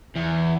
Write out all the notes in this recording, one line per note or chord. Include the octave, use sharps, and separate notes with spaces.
E2